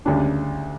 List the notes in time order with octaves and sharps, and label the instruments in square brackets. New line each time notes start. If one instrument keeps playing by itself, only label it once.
[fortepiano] D2 C#3 G3 D4